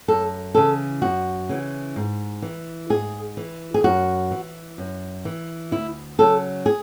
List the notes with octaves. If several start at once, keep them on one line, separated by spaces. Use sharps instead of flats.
F#2 A4
C#3 E3 A4
F#2 F#4
C#3 E3
G#2
E3
G#2 G#4
E3
G#4
F#2 F#4
E3
F#2
E3
D2 E4
C#3 F#3 A4
G#4